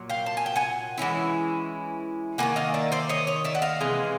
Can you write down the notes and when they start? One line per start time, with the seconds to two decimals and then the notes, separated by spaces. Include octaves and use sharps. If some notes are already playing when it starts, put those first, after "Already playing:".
Already playing: A#2 F#3
0.09 F5 G5
0.26 A5
0.37 G#5
0.46 G5
0.56 F#5 G#5
0.98 E3 G#3 C#4 E4
2.38 D#3 G3 A#3 F#5 G#5
2.56 D#5 F5
2.74 D5 E5
2.92 C5 D5
3.09 C#5 D#5
3.27 C#5 D#5
3.44 D5 E5
3.55 F#5
3.62 D#5 F5
3.81 C3 E3 G#3